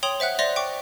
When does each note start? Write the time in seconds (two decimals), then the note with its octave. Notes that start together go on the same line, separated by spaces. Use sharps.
0.03 C#5 G5 C6 D#6 F7 F#7
0.20 C5 E5 F#5 F#6
0.39 C5 D5 E5 C6 A#6 F7
0.56 G5 C#6 D6